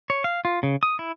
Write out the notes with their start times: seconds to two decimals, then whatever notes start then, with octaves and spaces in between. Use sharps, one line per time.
0.10 C#5
0.24 F5
0.45 F4
0.63 C#3
0.83 D#6
0.99 E4